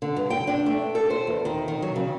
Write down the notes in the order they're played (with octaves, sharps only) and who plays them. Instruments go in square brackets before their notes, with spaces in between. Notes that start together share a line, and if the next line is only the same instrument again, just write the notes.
[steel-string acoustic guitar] D3
G2
G5
D4
A3
A4
C5
E2
D#3
D#3
F#3
C#3